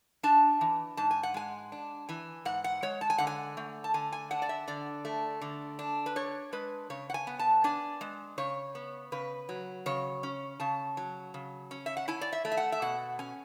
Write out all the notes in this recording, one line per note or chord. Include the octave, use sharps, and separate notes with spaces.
D4 A5
E3
G#2 A5
G#5
F#5
G#3 G#5
D4
E3 G#5
G#2 F#5
F#5
G#3 C#5
A5
G#5
D3 F#5
G#5
A3
A5
D3 G#5
G#5
D4 F#5
D5
E5
D3 D5
A3
D3
D4
B4
D4 C#5
G#3 B4
C#3 C#5
F#5
G#5
B3
A5
D4 G#5
G#3
C#3 C#5
B3
C#3 B4
F#3
C#3 C#5
C#4
C#3 A5
F#3
C#3
C#4
E5
F#5
E4 G#5
D5
E5
A3
E5
F#5
E5
B2 F#5
C#4 G#5